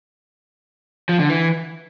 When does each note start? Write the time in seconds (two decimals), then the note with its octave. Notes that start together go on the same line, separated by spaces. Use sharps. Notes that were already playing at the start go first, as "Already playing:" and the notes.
1.09 F3
1.19 D3
1.29 E3